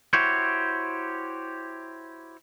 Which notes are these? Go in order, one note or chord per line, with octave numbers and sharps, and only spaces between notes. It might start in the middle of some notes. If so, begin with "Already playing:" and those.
E4 F#4 G4 C5 C#5